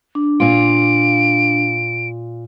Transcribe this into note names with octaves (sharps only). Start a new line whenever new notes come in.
D4
A#2 F4 D7